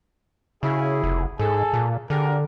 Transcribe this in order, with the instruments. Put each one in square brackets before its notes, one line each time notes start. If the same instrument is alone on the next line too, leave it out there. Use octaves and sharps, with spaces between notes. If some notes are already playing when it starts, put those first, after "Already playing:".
[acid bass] C#3 [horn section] E4 F#4 G#4
[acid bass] F1
[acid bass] G#2 [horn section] G#4 A4
[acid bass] A#2
[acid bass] D3 [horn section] G4 G#4 A#4